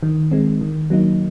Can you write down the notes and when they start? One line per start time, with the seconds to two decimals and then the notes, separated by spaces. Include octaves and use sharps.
0.03 D#3
0.32 G#3 C4
0.61 D#3
0.90 F#3 A#3 D#4